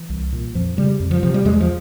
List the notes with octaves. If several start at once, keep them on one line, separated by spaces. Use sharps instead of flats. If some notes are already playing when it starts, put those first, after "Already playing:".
Already playing: E3
C2
A#2
F2 F3
C#3 G3
F2
F3
C3 F3
G3
E2 G#3
F3